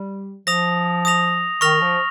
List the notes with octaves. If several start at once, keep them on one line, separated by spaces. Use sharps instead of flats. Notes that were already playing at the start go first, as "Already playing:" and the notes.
Already playing: G3
F3 D#6 A#6 F7
D#6 A#6 F7
D#3 C#6 F6 A#6 F7
F3